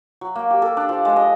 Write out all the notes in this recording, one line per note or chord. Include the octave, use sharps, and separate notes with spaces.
F#3
A#3
G4
A4
D4
F3
G#3
D#5